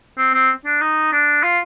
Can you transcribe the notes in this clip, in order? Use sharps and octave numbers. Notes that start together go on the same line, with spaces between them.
C4
C4
D4
D#4
D4
F4